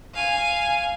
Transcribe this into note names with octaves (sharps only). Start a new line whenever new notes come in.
F5 G#5